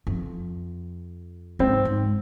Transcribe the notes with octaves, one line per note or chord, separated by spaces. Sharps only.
F2
G#2 C4
G#2